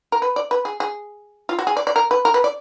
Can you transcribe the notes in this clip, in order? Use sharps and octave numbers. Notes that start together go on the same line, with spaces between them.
A#4
B4
D5
B4
G#4
G#4
F4
F#4
G#4
D5
D5
A#4
B4
A#4
B4
D5